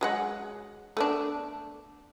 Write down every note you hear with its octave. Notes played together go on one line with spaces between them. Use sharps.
F#3 G#3 F#5
A3 B3 D4